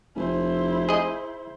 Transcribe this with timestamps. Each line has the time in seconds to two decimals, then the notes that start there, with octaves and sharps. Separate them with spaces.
0.16 F1 E4 C5
0.89 G#4 D#5